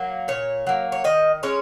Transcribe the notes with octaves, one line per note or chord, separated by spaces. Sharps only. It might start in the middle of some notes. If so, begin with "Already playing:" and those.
Already playing: F#3 A#3
A#2 C#5
F#3 A#3
C#5
D#3 D#5
G#3 C#4 C#5